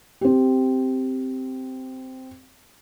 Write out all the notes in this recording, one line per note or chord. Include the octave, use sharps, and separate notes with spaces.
C4 G4